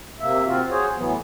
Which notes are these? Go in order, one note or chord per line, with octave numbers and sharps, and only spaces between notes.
C3 A#3 E5
C4 F4 F#4
F#4 G#4 C5 C#5
A2 E3 F#3 B3